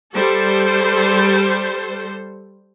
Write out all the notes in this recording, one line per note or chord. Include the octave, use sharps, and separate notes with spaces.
G3 A4 C5